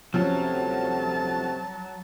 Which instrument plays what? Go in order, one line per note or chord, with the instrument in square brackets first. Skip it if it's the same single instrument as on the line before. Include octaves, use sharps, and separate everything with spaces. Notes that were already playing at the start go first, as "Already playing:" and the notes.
[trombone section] D2 C3 [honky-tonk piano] F3 C#4 [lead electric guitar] F#3 [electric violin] A5